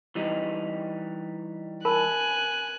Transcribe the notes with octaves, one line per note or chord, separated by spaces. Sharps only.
E3 G3 D#4
A#4 G#5 A5 B5 F#6